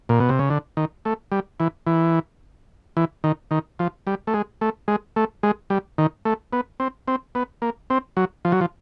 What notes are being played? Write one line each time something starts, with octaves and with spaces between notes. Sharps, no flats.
A#2
B2
C3
C#3
D3
D#3
A3
G3
E3
E3
E3
D#3
D#3
F3
G3
A3
G#3
A3
G#3
A3
G#3
G3
D#3
A3
B3
C4
C4
B3
A#3
C4
F#3
F3
F#3
F3